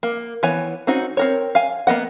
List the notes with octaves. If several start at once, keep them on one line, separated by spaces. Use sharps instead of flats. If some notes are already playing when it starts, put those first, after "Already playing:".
A#3
E3 B3 C#5 G#5
C4 C#4 D#4 F#4
C4 A#4 C#5
F5 G#5
A#3 B3 D#5 F#5